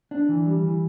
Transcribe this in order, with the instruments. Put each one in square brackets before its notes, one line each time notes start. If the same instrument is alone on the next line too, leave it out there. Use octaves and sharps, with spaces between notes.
[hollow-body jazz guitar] D4
E3
G3
E3